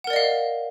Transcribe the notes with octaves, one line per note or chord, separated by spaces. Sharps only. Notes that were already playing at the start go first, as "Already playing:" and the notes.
A#4 D5 D#5 F5 F#5